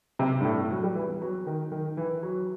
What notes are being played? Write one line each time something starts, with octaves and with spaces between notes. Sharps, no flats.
C3
G2
A2
F#3
G3
E3
B3
F#3
D#3
D#3
E3
F#3